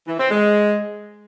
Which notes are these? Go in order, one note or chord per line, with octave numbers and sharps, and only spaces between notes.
E3
C4
G#3